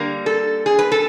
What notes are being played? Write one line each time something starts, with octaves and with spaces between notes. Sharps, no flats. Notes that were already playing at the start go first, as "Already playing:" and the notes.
Already playing: D3 G3 A#3 A#4
A4
G#4
B4
A4